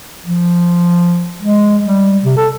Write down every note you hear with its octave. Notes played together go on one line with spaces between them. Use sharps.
F3
G#3
G3
C3
A4